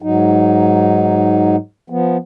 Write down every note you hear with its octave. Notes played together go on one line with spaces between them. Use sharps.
G#2 F#3 D#4
F3 B3